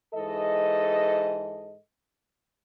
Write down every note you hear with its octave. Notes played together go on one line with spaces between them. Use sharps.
G#2 E3 A4 D#5